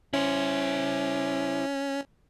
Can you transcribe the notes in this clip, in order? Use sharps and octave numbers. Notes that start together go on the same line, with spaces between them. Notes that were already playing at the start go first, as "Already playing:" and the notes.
C#4 E4 C5